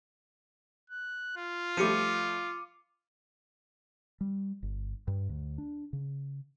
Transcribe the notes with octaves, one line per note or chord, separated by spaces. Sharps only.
F#6
F4
F3 G3 A3 D6 C#7 D#7
G3
G1
G2
D2
D4
C#3